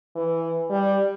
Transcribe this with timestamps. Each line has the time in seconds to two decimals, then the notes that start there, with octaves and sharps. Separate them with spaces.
0.16 E3
0.71 G3